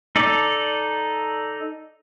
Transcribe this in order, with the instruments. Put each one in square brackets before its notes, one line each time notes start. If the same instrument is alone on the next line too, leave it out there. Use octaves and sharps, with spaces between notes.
[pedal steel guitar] D#4 A4 D5